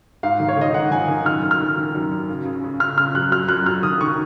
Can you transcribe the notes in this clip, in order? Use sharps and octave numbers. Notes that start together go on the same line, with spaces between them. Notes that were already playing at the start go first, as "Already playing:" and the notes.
G#2 F5
D#3
C#5
D#3 D#5
G#2 F#5
D#3 G#5
D#3
F#2 F6
D#3
F6
D#3
D#3
F#2
F#2
C#3
C#3
C#3
C#3 F6
C#3 F6
F#2 F#6
F#2 F6
F#2 F#6
F#2 F6
D#3 D#6
D#3 C#6